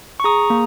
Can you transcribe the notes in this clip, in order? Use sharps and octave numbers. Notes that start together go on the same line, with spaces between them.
C#6
G#4 A#5 D#6
A#3